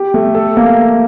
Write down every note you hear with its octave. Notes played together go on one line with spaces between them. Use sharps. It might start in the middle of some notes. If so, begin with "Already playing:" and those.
Already playing: G4
A3
A4
A#3